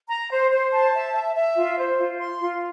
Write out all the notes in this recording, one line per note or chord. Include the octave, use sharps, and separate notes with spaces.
A#5
C5
C5
A5
E5
E5
E5
F4
C5
F4
C6
F4